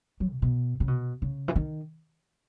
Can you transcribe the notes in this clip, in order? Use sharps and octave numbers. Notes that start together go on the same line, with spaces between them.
F#3
B2
B2
C#3
B2
C#3
E3
D#3